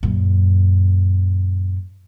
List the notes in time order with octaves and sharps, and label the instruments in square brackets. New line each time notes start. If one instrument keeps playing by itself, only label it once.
[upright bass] F#2 A#2